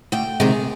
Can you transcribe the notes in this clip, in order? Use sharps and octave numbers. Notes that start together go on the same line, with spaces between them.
D2 G5
C3 D#3 G#3 G#4